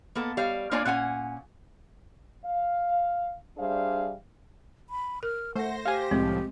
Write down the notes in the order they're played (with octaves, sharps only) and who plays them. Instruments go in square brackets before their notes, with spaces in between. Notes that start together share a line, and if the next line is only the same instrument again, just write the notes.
[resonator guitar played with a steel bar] A#3 B3 A4
G3 C#5 F5
A#3 D4 F4 C#5 D5 G#5
A#2 C#4 F#5 G#5
[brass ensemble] F5
G3 D4 G#4 C5 E5 F5
[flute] B5
[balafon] A#4 [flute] F6
[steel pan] A3 [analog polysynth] C5 A#6 [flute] F#5
[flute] G4 [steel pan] F5 G#5
[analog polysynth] C2 A2 F3 [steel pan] G#3 [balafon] C4